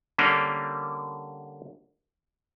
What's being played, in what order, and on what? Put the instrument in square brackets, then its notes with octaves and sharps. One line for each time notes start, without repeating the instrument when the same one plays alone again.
[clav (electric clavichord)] D3 G3 A#3 C#4 D4